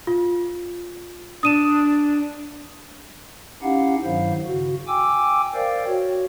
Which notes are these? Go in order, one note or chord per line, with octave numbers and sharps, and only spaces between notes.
F4
D4 D#6 D#7 E7
C#4 D#4 E4 G4 F5 F#5
G2 D#3 F#3 E4 C5 F5
C#3 F#4
G5 G#5 D6 E6
A#4 C5 D5 F5 G5
F#4 C#5